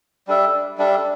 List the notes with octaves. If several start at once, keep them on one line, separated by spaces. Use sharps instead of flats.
G3 D4 A4 E5
G3 D4 A4 E5